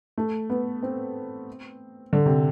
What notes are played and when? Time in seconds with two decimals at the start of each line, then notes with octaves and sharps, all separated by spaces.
0.18 A3
0.50 B3
0.83 C4
2.13 D3
2.26 C3